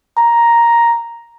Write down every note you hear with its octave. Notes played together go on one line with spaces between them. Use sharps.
A#5